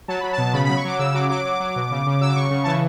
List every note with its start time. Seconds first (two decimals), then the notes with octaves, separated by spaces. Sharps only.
0.08 F#3 A5
0.20 F#3 B5
0.33 A5
0.38 B2
0.53 C#3 B5
0.65 F#3 B5
0.77 C#6
0.85 F#3 D6
0.99 C#3 E6
1.14 F#3 D6
1.29 F#3 D6
1.45 F#3
1.60 F#3
1.76 B2
1.91 C#3
2.06 C#3
2.21 F#3 E6
2.29 D6
2.36 C#3 C#6
2.51 C#3
2.64 E3 A5